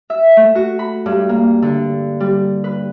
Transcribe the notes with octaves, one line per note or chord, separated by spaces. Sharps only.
E5
A3
F#4
B5
G2
A#3
D3
G3
B4